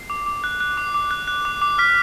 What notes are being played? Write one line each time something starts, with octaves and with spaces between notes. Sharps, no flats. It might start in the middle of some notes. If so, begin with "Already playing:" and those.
Already playing: C7
D6
D6
F#6
F#6
D6
D6
F#6
F#6
D6
D6
F6 B6